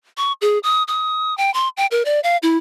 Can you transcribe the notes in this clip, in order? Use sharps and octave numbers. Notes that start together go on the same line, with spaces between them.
C#6
G#4
D#6
D#6
G5
C6
G5
A#4
D5
F5
E4